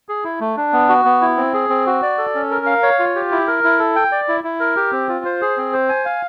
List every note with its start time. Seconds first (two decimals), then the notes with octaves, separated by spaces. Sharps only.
0.09 G#4
0.24 E4
0.40 A3
0.57 D4
0.73 B3
0.89 F#4
1.05 B3
1.21 E4
1.37 C4
1.54 G#4
1.69 C4
1.86 F#4
2.03 D5
2.18 A4
2.35 C#4
2.51 A#4
2.66 F5
2.83 C#5
2.99 F4
3.16 G4
3.32 E4
3.47 A#4
3.64 E4
3.79 A4
3.96 G5
4.12 D5
4.28 E4
4.44 E4
4.60 A#4
4.76 G4
4.92 C4
5.08 F4
5.25 C5
5.41 G#4
5.57 C4
5.73 C5
5.89 G#5
6.05 F5